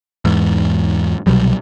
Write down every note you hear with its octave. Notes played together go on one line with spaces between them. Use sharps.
E2 G#2
C2 B2 F#3 G3